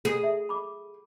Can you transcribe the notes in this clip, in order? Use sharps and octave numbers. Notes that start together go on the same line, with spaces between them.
G#4
E5
B5 D6